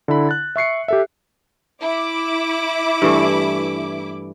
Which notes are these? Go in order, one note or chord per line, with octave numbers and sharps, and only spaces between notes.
D3 E4 B5
F#6 A6
E5 C#6 C7 C#7
G4 A4 E5
E4 D6
G2 E3 A3